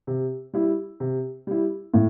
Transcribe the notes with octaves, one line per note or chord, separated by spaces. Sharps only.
C3
G3 E4
C3
G3 E4
A2